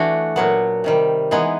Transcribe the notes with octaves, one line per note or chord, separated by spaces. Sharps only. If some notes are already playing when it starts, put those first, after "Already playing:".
Already playing: E3 A3 D4 F#4
A#2 F#3 B3
C3 D#3 G3
E3 G#3 B3 D#4